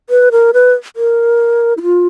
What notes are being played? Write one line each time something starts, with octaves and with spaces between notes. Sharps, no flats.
B4
A#4
B4
A#4
E4
F4